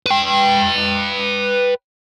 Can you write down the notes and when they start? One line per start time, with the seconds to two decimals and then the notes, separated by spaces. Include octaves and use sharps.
0.06 B4 G5